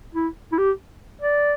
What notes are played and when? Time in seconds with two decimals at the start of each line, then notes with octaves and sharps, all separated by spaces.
0.15 E4
0.52 E4
0.58 G4
1.22 D5